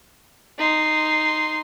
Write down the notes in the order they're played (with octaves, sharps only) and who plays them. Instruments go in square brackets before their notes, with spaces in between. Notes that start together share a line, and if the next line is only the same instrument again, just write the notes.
[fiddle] D#4 C6